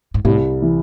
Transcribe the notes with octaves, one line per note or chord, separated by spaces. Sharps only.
G#2
C2 A2
E3